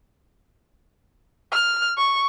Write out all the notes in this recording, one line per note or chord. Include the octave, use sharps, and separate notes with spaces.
F6
C#6